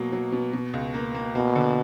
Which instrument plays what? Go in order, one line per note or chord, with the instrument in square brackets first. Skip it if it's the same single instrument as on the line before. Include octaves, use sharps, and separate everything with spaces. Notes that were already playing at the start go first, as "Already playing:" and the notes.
Already playing: [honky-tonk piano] B2 F#3 A#3
F#3
B2
B2
C#2
A#3
A#3
[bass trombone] B2 [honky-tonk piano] A#3
[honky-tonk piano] D3